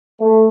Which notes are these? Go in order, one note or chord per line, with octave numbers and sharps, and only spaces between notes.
A3